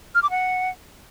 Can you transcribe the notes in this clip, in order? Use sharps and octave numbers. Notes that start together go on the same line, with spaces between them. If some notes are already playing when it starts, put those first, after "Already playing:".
F6
D6
F#5